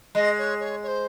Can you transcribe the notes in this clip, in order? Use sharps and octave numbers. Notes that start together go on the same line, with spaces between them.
G#3 D#5
C#5
C#5
C#5
C5